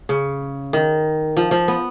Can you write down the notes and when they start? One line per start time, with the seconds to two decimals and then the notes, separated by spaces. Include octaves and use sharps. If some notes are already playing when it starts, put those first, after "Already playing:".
0.09 C#3
0.73 D#3
1.37 F3
1.51 F3
1.68 B3